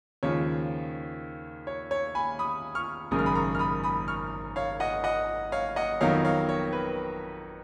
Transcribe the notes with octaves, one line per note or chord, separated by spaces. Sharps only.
D#2 C#3 F3 G#3 C#5
C#5
C#5
G#5 B5
B5 D#6
C#6 F6
G#1 F#2 C#3 G#3 D#6
F6
B5 D#6
A#5 C#6
F6
B5 D#6
B5 D#6
C#6 F6
C#5 F5
D#5 F#5
D#5 F#5
C#5 F5
D#5 F#5
F2 D#3 F#3 B3 C#5 F5
C#5 F5
C#5
B4